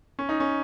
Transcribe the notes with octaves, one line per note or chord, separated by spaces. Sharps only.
C#4
D#4
C#4